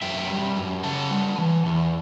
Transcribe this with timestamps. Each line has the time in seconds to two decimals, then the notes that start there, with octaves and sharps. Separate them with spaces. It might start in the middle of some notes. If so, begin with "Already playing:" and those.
0.02 F#2 E5 G5
0.30 G3
0.57 F#2
0.83 C#3 F#5 A5
1.11 G3
1.38 E3
1.66 E2